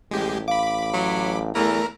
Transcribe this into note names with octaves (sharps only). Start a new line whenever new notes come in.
A1 G#3 G4
F5 B5 D6
F#3
E2 E3 A3 A#4 A#5